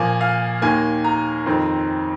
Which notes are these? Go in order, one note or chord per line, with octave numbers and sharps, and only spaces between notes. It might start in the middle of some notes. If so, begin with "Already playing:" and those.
Already playing: A#2 F3 A#3 G#5
F5
D#2 D#3 A#3 G#5
A#5
F2 D#3 C4